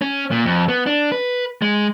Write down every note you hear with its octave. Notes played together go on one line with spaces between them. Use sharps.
C#4
A#2
F2
B3
D4
B4
G#3